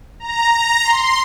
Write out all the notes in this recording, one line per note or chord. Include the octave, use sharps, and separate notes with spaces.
A#5
A#5
C6